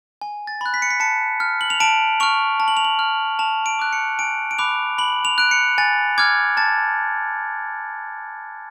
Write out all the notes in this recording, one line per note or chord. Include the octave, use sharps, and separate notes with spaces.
G#5
A6
B5 F#6
B6
C#7
B6
A5 C#7
F6
F#7
F7
A5 D7
C#6 F6 F7
A5
F#7
F7
F#7
F6
A5 F7
D7
D6 F#6
C#7
G#5 D7
D7
B5 D6 F#6 F7
B5 F#7
F7
F#6 D7
C#7
G#5 A6
D6 F6 G#6
A5 A6